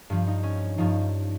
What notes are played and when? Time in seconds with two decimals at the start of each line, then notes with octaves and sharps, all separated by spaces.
0.10 G2 F3
0.27 D#4
0.43 C#4
0.78 G2 F3 D#4